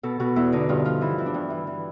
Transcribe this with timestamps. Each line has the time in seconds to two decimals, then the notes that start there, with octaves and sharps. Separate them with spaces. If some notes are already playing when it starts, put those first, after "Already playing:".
0.03 B2 A4
0.20 B2 F#4
0.36 E2 E4
0.52 D3 D#4
0.69 G2 F4
0.85 F3 F4
1.01 E3 E4
1.18 E3
1.26 D4
1.34 G2
1.50 E3
1.67 E3